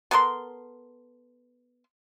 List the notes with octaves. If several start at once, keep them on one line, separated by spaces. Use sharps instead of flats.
B3 A4 A#4 C6